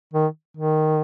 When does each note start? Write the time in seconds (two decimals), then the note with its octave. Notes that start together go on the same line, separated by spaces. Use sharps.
0.13 D#3
0.57 D#3